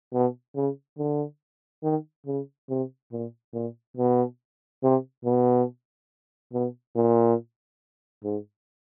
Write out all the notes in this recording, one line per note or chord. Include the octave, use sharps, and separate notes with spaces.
B2
C#3
D3
D#3
C#3
C3
A#2
A#2
B2
C3
B2
B2
A#2
G#2